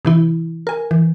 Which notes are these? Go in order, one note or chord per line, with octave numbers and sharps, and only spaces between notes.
C3 E3 E4
A#4 G#5
E3